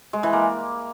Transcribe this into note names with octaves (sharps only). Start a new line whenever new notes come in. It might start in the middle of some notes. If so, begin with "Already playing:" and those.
G#3
E3
A#3